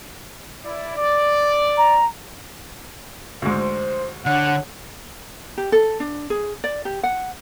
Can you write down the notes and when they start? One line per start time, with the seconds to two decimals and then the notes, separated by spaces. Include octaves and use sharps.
0.65 E4 D5
0.96 D5
1.78 A#5
3.42 D2 G#2 C5
4.26 C2 D3 C#5 F#5
5.58 G4
5.72 A4
6.00 D4
6.30 G#4
6.64 D5
6.85 G4
7.03 F#5